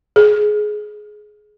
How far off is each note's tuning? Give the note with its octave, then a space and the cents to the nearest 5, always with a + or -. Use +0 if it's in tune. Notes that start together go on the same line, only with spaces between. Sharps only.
G#4 +15